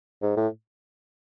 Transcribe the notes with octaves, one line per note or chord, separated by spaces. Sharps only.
G#2
A2